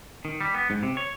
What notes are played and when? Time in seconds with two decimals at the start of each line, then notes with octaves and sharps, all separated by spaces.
0.25 D#3
0.41 G3
0.55 B3
0.70 G#2
0.83 C3
0.97 C#5